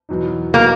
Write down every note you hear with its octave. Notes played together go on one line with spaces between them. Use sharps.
E2 B2 F#3 B3 D#4
B2 F#3 A#3 B3 D#4